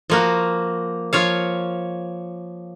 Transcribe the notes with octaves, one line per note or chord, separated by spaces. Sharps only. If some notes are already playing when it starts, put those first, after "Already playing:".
F3 A#3 F#4
F3 C#5 F5